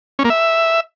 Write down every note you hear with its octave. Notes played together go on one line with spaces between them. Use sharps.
C#4
A#3
E5